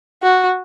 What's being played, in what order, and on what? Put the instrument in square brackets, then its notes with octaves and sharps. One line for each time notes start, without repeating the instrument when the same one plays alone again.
[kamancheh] F#4